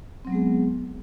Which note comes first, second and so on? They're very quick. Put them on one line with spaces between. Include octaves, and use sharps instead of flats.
C4 F#3 B3 G#3 G#4